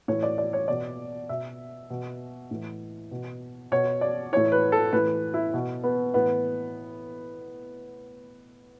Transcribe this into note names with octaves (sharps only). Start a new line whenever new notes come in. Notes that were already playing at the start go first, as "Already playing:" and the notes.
A2 E3 C#5
D5
D5
C#5
B2 D5
B2 E5
B2
A2 E3
B2
B2 C#5
D5
A2 E3 C#5
B4
A4
A2 E3 B4
E4
B2
B3
A2 E3 B3